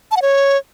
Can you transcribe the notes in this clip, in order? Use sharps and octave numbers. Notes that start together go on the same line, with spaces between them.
A5
F#5
C#5